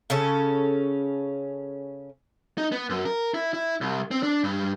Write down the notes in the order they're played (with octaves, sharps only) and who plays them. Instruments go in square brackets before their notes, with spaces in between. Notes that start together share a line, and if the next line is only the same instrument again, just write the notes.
[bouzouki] C#3 C#4 A4
[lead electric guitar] D#4
B3
F#2
A#4
E4
E4
C2
C4
D4
G2